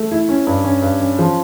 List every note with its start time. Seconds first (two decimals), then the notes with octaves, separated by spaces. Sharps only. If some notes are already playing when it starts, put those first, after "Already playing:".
Already playing: A3
0.12 E4
0.29 C#4
0.47 G2
0.64 C#4
0.82 G2
1.01 C#4
1.19 F3